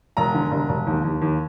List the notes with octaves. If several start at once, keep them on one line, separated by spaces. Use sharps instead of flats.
E1 A#5
D3
E1
E1
D#2
D#2
D#2